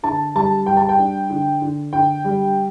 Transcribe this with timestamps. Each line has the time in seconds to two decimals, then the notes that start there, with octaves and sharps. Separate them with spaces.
0.03 D3 A5
0.35 G3 A5
0.66 G3 G5
0.77 A5
0.89 G5
0.98 D4
1.30 D3
1.61 D3
1.92 D3 G5
2.25 G3